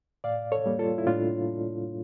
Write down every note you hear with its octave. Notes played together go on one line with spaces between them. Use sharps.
A2 D5 F5
A4 C#5
G3 A#3
F4 A4
E4
A2 D4 F4